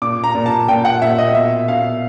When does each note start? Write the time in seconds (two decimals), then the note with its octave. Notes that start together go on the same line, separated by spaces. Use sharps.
0.02 A#2 D6
0.24 A#5
0.35 A#2
0.46 A5
0.68 A#2 G5
0.85 F#5
1.02 A#2 E5
1.19 D#5
1.35 B2 E5
1.68 B2 F5